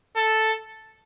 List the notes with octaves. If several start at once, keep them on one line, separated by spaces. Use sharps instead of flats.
A4